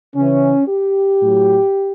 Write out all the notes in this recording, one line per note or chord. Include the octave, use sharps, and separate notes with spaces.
C#3 E3 C#4
G4
A2 F#3